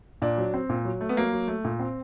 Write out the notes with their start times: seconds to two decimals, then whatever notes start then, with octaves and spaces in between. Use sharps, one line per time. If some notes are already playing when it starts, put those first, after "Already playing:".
0.22 A#2 D4
0.38 F#3
0.54 C4
0.69 A#2
0.85 F#3
1.01 A3
1.09 B3
1.17 F#3 A#3
1.32 F#3
1.48 A3
1.65 A#2
1.79 C4